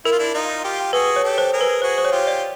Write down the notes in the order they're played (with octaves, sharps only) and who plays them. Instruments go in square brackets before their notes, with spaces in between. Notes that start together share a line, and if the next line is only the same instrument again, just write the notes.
[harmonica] E4 [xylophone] A#4
[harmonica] F4
D4 E4
D#4 F4
F4 G4
[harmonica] F#4 G#4 [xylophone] B4
[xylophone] C#5
[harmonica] G4 A4
[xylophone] C5
[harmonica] G#4 A#4
[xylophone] B4
[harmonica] F#4 G#4 [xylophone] C5
[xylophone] C5
C#5
[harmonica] F4 G4
[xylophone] D5